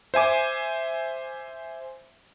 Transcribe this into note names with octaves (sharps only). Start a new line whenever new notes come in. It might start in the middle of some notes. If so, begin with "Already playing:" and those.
C5 E5 G#5 D6